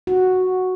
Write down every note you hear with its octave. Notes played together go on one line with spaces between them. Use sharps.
F#4